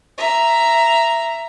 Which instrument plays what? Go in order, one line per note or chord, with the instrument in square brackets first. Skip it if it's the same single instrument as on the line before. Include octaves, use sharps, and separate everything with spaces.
[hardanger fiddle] E5 A#5